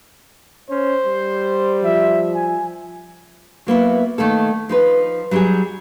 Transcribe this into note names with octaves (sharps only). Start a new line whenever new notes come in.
C#4 C5
G3
F3 E5
G#5
F#3 A#3 B3 E4
D#3 A3 A#3 A4
F3 D#4 B4
F#3 G3 D4 G4 G#4